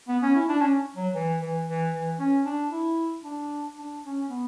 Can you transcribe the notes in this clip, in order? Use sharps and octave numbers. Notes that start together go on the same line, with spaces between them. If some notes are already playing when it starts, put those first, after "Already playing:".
B3
C#4
E4
D4
C#4
F#3
E3
E3
E3
E3
C#4
D4
E4
D4
D4
C#4
B3